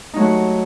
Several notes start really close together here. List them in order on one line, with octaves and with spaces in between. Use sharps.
D#4 F#3 A3 F#4